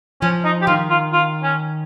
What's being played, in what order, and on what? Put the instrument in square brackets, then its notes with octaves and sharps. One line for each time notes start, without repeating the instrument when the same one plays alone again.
[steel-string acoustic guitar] F3 [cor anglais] C#4
[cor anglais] D#4
G4
[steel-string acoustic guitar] D#3 [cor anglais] F4
[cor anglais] F4
F4
C#4